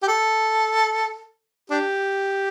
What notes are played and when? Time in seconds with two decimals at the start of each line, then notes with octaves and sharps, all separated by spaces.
0.03 G4
0.08 A4
1.70 D4 G4